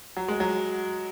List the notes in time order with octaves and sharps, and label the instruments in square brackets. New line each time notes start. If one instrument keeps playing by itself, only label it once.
[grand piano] F#3
G#3
F#3